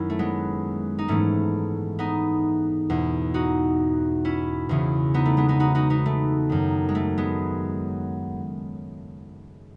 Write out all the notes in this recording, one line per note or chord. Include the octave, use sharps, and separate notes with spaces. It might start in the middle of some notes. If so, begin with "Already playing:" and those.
Already playing: F#2 D#3 C#4 E4
A3
G#3 B3
D#4
G#2 E3 A3 C#4
B3 D#4
E2 B2
D#4 F#4
C#4 E4
E2 C#3 E3
B3 D#4
A3
G#3 B3
B3 D#4
D#4 F#4
D#4 F#4
B3 D#4
A3
F#2 D#3
G#3
A3
G#3 B3